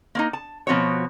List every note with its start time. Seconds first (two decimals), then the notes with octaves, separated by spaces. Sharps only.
0.15 A#3 C4 D#4
0.33 A5
0.67 B2 F3 C4 F#4 C#5